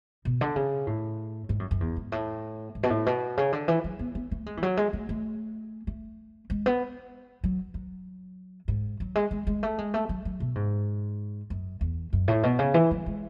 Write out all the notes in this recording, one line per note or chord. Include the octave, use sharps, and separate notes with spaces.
B2
D3
C#3
A2
G#2
F#2
F#2
E2
G#2
A2
G#2
B2
A2
B2
C#3
D3
E3
F#3
B3
B3
A3
G#3
E3
F#3
G#3
A3
A3
A3
G#3
B3
F#3
F#3
G#2
F#3
G#3
G#3
G#3
A3
G#3
A3
F#3
F#3
B2
G#2
F#2
E2
F#2
A2
B2
C#3
E3
F#3
G#3